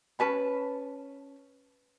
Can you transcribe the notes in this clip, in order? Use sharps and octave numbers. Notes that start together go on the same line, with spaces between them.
C#4 B4 A5 B5